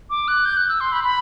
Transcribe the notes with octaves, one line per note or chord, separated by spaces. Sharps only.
D6
F#6
G6
F#6
E6
C6
B5
B5